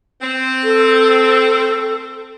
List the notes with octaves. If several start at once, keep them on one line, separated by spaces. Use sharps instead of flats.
C4
A4